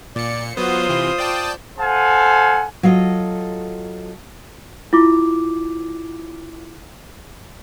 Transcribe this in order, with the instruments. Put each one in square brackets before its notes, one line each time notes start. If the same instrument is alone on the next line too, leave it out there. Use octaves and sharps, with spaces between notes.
[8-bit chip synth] A#2 C#7 [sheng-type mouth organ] D5
[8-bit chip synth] F#3 B3 [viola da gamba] F4 C5 [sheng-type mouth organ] D#6
[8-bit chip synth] C3 E3
D5 G5 A5
[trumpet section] A4 C5 F5 F#5 G#5
[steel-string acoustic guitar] F#3 F4 A4 D#5
[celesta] E4 F4 D6